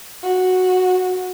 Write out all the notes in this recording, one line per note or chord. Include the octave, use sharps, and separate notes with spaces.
F#4